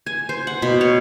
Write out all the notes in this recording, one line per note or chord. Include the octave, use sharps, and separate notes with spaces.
G#5
C5
F#5
B2
C#5